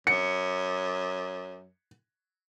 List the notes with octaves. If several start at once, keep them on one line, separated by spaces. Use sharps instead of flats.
F#2 C#7